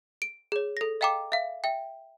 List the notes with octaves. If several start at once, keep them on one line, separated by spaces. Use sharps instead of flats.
D7
G#4 C#5
A4 A#6
D#5 F5 G5 A#5 D6
E5 F5
E5 G5